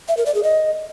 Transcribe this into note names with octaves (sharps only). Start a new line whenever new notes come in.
E5
A#4
D5
G#4
D#5